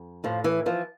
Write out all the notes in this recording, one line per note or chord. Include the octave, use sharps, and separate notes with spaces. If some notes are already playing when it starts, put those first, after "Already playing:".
Already playing: F2
A2 F3
E3
E3 F3